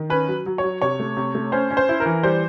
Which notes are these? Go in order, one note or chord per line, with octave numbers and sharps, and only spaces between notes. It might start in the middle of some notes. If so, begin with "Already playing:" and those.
Already playing: D#3
C#4 B4
F#3
F#3
C#5
F#3
C3 C#5
A3
C3
A3
C#4 C5
C#4
C5
E4
A#4
E3
G3 C5